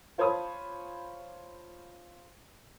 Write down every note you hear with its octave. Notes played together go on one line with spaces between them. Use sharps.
F4 C5 C#5 A5 B5 D#6